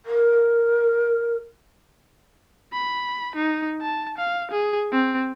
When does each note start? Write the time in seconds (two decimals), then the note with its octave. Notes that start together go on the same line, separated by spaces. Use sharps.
0.06 A#4
2.72 B5
3.35 D#4
3.81 A5
4.17 F5
4.51 G#4
4.92 C4